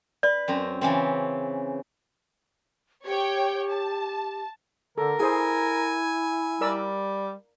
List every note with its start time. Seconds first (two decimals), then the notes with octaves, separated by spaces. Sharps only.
0.23 B4 D5
0.48 F#2 C4 A#5
0.81 C#3 E3 C4
3.05 G4 C#5 G5
3.70 A5
4.98 D3 A4 A#4
5.20 E4 G#4 C5 G#5
6.61 G3 A#4 D5 E6